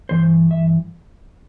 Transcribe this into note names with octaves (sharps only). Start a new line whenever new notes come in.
G2 E3 C5
E5